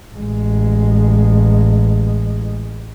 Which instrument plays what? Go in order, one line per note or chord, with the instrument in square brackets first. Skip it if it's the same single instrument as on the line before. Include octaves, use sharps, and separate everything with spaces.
[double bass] A1 G#3